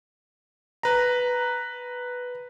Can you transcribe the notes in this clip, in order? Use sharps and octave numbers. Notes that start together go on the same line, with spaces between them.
B4 A#5